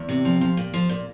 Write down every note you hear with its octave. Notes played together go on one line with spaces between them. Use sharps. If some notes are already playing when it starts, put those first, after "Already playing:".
Already playing: E2
C3
F3
F3
A#2
F3
A#2